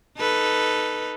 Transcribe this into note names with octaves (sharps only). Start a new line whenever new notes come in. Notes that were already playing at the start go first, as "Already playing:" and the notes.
D#4 A4 B4